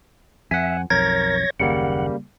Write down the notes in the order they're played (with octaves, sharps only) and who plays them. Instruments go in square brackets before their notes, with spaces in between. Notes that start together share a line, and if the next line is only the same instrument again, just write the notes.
[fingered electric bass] F2 [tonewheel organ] E5 [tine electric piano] F#5 G#5
[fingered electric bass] B1 F2 [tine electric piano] A#4 [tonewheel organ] C#5 G#6 A#6
[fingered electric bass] F#1 D#2 [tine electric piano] C#3 G3 A#3 [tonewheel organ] F#5